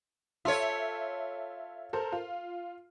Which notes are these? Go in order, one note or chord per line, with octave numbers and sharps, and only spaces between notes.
F4 A4 C#5 E5
A4 A#4 C5
F4